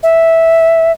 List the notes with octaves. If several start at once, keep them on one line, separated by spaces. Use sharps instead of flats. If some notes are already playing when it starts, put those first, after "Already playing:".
E5